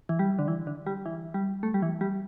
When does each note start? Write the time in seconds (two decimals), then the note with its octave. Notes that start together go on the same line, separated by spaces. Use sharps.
0.09 E3
0.19 G3
0.39 D3
0.48 E3
0.67 D3
0.86 G3
1.06 E3
1.34 G3
1.63 A3
1.74 G3
1.82 E3
2.01 G3